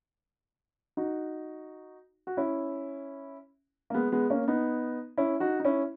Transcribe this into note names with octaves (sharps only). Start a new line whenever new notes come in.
D#4 F#4
F#4
C#4 E4
A#3
G#3 B3
G#3 B3
A#3 C#4
B3 D#4
C#4 E4
D#4 F#4
D#4
C#4 E4